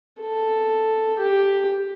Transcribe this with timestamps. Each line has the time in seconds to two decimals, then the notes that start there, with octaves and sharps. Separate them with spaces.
0.21 A4
1.19 G4